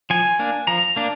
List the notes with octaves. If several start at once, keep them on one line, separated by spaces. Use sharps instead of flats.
F3 G#5
A#3 D4
F3 A#5
A#3 D4